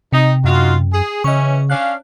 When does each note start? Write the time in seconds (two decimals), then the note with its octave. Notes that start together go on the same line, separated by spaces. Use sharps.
0.13 C3 D#4
0.44 F#2 D#4 F4 F#4
0.93 G#4
1.24 C#3 E3 C#4 D#5 C#6
1.70 C#4 D4 F5 F#6